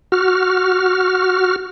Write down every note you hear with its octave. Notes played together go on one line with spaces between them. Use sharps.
F#4 F6